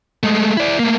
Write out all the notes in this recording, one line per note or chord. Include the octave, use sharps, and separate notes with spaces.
G#3 A3
E4 D5
A3 A#3